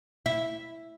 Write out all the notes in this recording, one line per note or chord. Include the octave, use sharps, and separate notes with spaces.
E4